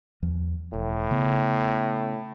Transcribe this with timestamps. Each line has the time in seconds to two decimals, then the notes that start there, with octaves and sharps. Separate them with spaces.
0.23 E2 F3
0.73 E1 A2
1.11 C#3 B3